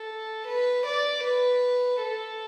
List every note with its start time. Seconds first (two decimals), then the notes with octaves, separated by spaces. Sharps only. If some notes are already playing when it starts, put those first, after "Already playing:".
Already playing: A4
0.47 B4
0.86 D5
1.24 B4
2.01 A4